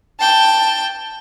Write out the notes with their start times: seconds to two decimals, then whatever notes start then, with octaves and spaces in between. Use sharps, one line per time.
0.19 G5 A5